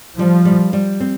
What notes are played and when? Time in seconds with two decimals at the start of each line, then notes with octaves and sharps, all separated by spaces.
0.18 F3 G3
0.45 G3
0.73 G3
1.00 C4